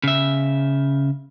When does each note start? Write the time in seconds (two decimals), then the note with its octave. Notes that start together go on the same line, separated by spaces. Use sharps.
0.04 C#3 E5